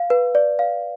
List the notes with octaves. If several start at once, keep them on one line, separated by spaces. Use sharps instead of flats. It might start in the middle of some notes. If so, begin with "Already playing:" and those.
Already playing: F5
B4
D5
F5